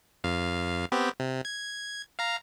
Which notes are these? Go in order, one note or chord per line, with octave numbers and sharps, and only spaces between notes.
F2 F5
B3 C4 G4
C3
G#6
F5 A#5